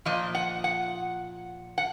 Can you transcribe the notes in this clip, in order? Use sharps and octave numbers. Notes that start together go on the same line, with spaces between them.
A#2 F3 D#5
F#5
F#5
F#5